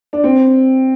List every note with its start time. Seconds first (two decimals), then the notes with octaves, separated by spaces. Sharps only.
0.13 D4
0.24 C4